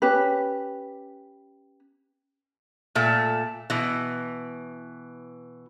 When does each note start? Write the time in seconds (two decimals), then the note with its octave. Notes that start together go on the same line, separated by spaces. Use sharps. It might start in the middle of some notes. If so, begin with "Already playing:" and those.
0.02 C#4 G4 B4
2.95 A#2 A3
3.70 B2 E3